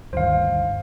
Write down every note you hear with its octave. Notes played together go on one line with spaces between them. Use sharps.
D2 G2 D#3 C5 F5